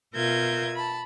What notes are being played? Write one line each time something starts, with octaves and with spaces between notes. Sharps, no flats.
B2 F4 A#4 E5 G6 G#6
A5 B5